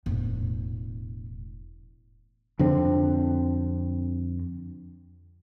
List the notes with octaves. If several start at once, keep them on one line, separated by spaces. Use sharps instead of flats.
E1 A2
F2 D3 C4